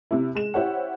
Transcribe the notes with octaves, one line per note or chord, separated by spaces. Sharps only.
C3 E4
G#3 E7
E4 G4 C5 C#5 F#5